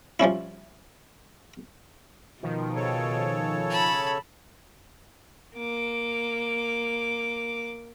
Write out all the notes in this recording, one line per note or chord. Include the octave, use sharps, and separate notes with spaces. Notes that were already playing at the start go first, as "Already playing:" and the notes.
F3 G3 C#4 E4
B2 D#3 F3
C#3 A4 C#5
A5 B5
A#3 D6